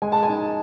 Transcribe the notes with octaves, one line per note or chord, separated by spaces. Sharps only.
G#3 G#5
A5
G#5
D#4